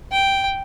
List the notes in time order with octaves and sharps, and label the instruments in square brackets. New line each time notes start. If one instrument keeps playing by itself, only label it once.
[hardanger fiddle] G5